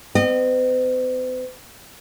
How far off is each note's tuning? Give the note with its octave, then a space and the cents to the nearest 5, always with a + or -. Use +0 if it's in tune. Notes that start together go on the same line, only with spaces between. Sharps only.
C4 -45 D#5 -35